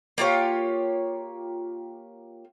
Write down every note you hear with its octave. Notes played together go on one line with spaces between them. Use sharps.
A#3 F4 G4 C#5